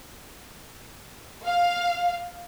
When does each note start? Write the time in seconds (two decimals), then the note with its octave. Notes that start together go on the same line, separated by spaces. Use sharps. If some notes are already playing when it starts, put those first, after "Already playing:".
1.46 F5